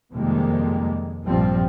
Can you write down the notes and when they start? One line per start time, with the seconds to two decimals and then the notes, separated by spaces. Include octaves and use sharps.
0.13 F2 C3 D#3 G3 G#3 A#3
1.23 A#1 G2 F3 G3 C4